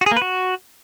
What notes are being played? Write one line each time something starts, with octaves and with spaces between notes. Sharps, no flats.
F#4
G#4
A#3
B4
F#4